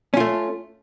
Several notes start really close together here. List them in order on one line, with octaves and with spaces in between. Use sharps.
C#4 F4 A3